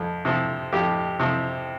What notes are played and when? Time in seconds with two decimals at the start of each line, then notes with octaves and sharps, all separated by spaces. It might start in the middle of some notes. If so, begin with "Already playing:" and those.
Already playing: F2
0.25 C3 F3
0.73 F2 G4
1.20 C3 F3